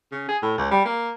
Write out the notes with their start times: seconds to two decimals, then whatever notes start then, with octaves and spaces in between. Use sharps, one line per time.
0.12 C#3
0.29 G#4
0.42 A2
0.58 C#2
0.71 G3
0.85 A#3